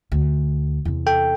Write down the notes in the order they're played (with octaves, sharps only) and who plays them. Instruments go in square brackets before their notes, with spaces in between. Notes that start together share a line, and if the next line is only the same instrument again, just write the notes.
[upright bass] D2
E2 C3
[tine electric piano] A4 G5